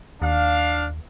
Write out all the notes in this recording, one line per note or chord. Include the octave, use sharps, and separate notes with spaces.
D#2 D4 F5